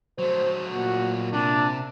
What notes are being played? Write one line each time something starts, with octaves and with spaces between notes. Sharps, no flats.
F#3 A3 C5
A#2 F#4
C3 D4